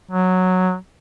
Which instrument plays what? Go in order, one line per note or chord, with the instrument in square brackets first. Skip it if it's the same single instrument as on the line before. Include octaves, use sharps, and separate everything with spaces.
[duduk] F#3